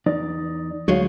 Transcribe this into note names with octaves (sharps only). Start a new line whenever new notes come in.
E2 D#4 D5
D2 F#3 G#3 F#4 C#5 F5